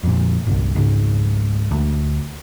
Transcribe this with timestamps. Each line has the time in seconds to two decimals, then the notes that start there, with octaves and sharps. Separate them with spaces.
0.03 F2 A#2
0.47 G1 C2
0.75 G#1 C#2 G#2
1.71 D2